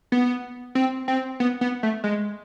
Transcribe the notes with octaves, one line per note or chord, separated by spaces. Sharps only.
B3
C4
C4
B3
B3
A3
G#3